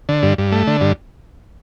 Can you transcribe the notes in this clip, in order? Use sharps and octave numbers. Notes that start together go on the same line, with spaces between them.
D3
G2
G2
A3
D3
G2